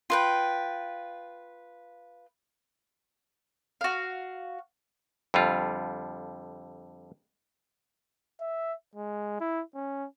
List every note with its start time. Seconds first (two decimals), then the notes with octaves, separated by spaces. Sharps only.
0.10 F4 B4 G5
3.81 F#4 F5
5.34 F2 D3 G3 F4
8.41 E5
8.96 G#3
9.40 E4
9.75 C#4